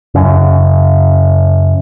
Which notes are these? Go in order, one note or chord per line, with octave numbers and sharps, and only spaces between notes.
F#2 C#3